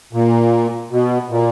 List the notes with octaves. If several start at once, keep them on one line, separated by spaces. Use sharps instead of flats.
A#2
B2
A#2